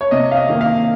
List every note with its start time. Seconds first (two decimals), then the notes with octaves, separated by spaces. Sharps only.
0.01 C#5
0.11 C3 D#5
0.31 F5
0.36 D#5
0.48 D#3 A#3
0.61 F5